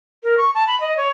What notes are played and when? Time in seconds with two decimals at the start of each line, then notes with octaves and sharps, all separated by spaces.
0.23 A#4
0.38 C#6
0.55 A5
0.67 B5
0.80 D#5
0.97 C#5